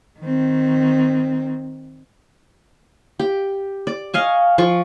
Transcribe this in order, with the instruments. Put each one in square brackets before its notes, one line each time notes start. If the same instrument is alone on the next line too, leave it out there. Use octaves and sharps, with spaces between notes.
[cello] D#3 C4
[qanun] G4
D5
D#5 F5 G#5 C#6
F3 F4 C#6